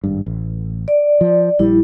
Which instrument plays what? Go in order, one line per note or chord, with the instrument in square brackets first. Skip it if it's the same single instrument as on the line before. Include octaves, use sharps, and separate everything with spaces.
[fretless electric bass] G#1 G2
A1
[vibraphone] D5
[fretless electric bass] F3
[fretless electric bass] A#1 G3 [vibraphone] E4